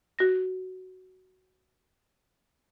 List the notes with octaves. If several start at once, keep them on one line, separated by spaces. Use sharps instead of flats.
F#4 A#6